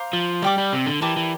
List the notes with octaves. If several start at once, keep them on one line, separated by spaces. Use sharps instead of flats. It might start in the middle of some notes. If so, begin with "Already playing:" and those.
Already playing: C5 F5 A#5 D6
F3
G3 D5 G5 D6
G3
C3
D3
E3 G4 A#4 D5 A5
E3